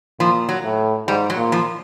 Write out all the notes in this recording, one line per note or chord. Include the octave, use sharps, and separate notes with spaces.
A#2 F3
F#3
A2
G#2 G3
F#3
A#2
F3